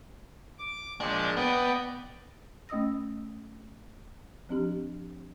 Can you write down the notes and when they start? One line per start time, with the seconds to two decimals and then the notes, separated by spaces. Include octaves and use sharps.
0.59 D6
1.01 A#2 F3 G#3 D4
1.37 B3 D5 D#5 G5
2.69 A3 C#4 D#5 D#6 E6 A#6
4.49 F3 C4 D4 G4